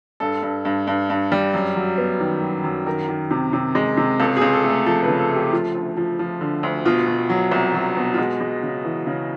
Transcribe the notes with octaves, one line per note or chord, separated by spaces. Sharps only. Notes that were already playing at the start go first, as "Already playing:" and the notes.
G2 A4
G2
G2
G2
G2
G3
F#2
F#3
B3
D#3
F#3
F#2
D#3 A#4
D#3
C3
C3
G#3
C3
C#2 A4
G#4
C#2
A4
A3
A4
F3 A4
B4
C#3
A4
A3
G4
F3 F4
D2
F3
F3
D3
D2
B2 F4
B2
F#3
C2
F#3
B2
F4
G#3 F#4
G#3
C#3
E3
C#3